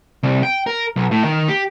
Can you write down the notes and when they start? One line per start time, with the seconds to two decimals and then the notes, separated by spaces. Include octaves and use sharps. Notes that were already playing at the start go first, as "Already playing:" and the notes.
0.23 C2
0.43 G5
0.66 A#4
0.96 B1
1.11 A2
1.24 D#3
1.48 G4